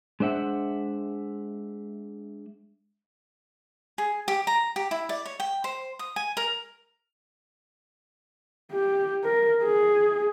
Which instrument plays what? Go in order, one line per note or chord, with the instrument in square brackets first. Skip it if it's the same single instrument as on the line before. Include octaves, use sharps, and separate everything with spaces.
[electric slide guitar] G#3 D4 C5 E5 F#5
[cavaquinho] G#4
G4
A#5
G4
E4
D5
C#5
G5
C5
D#6
G#5
A#4
[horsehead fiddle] G4
A#4
G#4